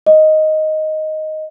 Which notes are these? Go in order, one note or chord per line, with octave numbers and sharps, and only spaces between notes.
D#5